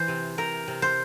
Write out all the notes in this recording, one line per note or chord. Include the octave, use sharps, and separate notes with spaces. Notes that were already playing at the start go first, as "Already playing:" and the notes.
Already playing: E3 C5
C3
C3 A#4
C3
C5